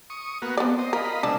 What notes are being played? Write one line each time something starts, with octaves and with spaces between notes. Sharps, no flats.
C#6 D#6
A#3 B3 F#4
B3 C4 D5
C5 D#5
F4 A#4 D#5 B5
C3 G#3 D4 E6